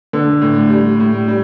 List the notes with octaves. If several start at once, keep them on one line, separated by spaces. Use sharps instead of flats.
D3
A2
G3
A2
G3